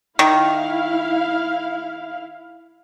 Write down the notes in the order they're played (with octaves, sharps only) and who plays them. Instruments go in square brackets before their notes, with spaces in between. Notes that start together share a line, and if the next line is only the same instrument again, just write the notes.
[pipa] D#3 [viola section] E4 F5